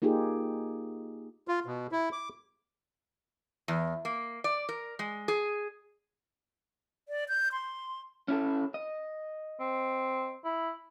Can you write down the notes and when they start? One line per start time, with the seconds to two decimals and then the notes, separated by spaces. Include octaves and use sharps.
0.02 A#3 D#4 F4 G4 G#4
1.48 F4
1.66 B2
1.92 E4
2.12 D6
3.68 E2
4.05 A#3
4.44 D5
4.69 A#4
4.99 G#3
5.28 G#4
7.08 D5
7.28 G6
7.52 C6
8.28 C#4 E4 A4
8.74 D#5
9.60 C4
10.45 E4